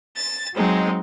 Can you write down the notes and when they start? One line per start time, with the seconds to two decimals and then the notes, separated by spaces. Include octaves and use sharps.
0.16 A6
0.55 F#3 G#3 C4 D#4